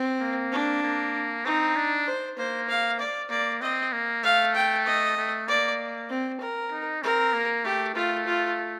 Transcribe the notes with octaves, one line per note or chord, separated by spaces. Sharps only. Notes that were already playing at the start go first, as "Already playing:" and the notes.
Already playing: C4
A#3
D4
A#3
C4 D#4
D4
C5
A#3 C5
F5
D5
A#3 D5
C4 D#5
A#3
A3 F5
G5
D#5
A3
A#3 D5
C4
A#4
D#4
C4 A#4
A#3
A3 G4
A3 F4
F4